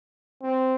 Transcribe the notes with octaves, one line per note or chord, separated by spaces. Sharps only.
C4